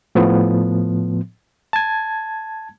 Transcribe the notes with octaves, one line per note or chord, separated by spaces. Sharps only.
A2 F3 B3
A5 G#6